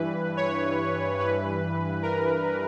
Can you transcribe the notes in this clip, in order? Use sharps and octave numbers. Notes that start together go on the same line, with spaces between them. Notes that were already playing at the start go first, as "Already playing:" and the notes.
Already playing: G2 E3 B4
C#5
G2 E3 B4
A#4